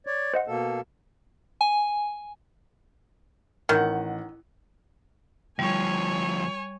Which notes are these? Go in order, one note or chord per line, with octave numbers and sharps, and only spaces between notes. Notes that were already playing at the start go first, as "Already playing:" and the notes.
C#5 D5
C5 D#5 F#5
B2 A#3 A4
G#5
A1 D#3 F#5
D2 F3 G3 C#5 G#5